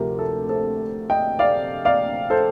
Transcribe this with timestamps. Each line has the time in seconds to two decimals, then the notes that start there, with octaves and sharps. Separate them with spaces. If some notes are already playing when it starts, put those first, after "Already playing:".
Already playing: D2 C3 F3 A3 G4 A#4
0.19 A4
0.49 A4 C5
1.10 D#5 G5
1.39 D5 F5
1.85 D5 F5
2.30 A4 C5